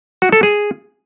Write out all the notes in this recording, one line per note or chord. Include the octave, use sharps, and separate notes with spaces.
F#4
A4
G#4